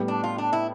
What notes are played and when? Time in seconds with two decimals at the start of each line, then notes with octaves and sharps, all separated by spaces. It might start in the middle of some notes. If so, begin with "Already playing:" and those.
Already playing: A2 G3 B3
0.08 D4
0.24 F4
0.38 D4
0.53 E4